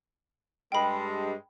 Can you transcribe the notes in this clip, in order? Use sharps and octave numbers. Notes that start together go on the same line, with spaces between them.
G2 G#3 A4 G5 B5